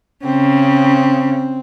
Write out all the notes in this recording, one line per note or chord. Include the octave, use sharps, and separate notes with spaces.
C#3 C4